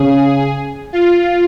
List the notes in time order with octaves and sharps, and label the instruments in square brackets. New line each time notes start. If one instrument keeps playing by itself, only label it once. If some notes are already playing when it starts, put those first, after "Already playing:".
Already playing: [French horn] C#3 [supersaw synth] G#4
[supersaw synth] F4